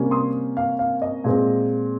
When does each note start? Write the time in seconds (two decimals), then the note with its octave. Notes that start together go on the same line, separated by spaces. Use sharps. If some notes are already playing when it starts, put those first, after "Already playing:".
Already playing: C3 G3 A#3 C#4
0.11 C6 D#6
0.57 F5
0.79 F5
1.02 D#5
1.24 A#2 G#3 C4